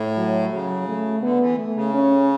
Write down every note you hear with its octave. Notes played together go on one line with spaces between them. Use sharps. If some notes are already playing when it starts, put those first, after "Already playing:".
Already playing: A2
F#3
C#3 F#3
A3
D3 B3
E3
A3
C#3
C#4